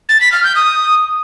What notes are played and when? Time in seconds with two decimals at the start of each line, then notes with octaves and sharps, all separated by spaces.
0.09 A6
0.20 B6
0.32 F6
0.44 G6
0.55 D#6